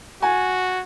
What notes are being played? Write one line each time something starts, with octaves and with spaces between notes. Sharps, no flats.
F#4 G#5